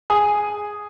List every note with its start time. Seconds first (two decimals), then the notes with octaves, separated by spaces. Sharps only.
0.10 G#4 G#5 D#6